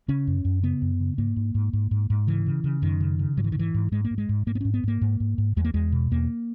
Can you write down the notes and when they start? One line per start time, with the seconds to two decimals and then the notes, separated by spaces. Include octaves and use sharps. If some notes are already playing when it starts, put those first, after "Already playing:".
0.08 C#3 C#4
0.27 F#2
0.45 F#2
0.63 C#3 B3
0.82 F#2
1.00 C#3
1.18 G#2 A#3
1.36 G#2
1.55 G#2
1.73 G#2
1.91 G#2
2.10 G#2
2.27 C#3 E3
2.46 C#3
2.64 C#3
2.82 F#2 D#3
3.00 C#3
3.19 C#3
3.37 G#2 F#3
3.44 E3
3.52 D#3
3.55 G#2 E3
3.74 G#2
3.92 G#2 G#3
4.05 A#3
4.11 G#2
4.18 G#3
4.29 G#2
4.47 G#2 A#3
4.55 B3
4.61 G#2 C#4
4.74 B3
4.84 G#2 A#3
5.01 G#2
5.20 G#2
5.38 G#2
5.57 E2 G#3
5.65 A#3
5.74 E2 G#3
5.92 B2
6.11 E2 A#3